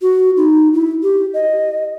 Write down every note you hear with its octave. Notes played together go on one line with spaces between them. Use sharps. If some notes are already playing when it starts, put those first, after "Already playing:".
F#4
D#4
E4
G4
D#5